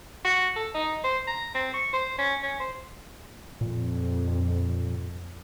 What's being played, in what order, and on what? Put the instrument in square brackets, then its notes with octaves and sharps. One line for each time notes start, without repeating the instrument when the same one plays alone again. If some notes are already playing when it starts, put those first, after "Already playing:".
[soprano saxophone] F#4
A4
D#4
C5
A#5
C4
C#6
C5
C#4
C#4
C5
[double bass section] F2 [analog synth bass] A#2